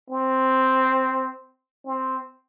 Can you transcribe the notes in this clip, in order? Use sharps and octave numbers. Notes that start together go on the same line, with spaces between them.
C4
C4